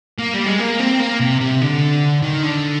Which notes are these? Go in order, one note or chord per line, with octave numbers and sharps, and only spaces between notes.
A#3
G3
G#3
A#3
C4
A#3
C3
C3
D3
D#3
D3